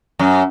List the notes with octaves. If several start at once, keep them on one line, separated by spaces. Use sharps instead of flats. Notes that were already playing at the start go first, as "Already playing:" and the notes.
F#2